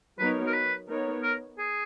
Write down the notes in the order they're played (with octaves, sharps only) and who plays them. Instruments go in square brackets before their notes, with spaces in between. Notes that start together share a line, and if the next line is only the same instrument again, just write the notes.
[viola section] F#3 B3 D#4 A#4 C#5 [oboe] B4
[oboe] A#4
B4
[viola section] B3 D#4 A#4 C#5
[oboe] A#4
G#4